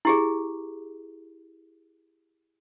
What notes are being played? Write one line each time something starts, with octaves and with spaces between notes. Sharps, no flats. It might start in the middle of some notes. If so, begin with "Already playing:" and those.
E4 G4 G#4